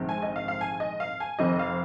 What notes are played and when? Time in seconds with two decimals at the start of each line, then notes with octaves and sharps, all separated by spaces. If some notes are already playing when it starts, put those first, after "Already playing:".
Already playing: A#1 G#2 D#3 C4
0.09 G#5
0.22 D#5
0.36 F5
0.48 F5
0.61 G#5
0.80 D#5
1.00 F5
1.20 G#5
1.39 F1 F2 D#3 C4 D#5
1.59 F5